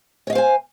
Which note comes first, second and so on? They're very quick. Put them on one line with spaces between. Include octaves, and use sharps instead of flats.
C#5 D#5 F5 C5 G#5